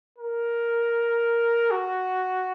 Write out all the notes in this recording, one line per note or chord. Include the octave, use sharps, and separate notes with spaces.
A#4
F#4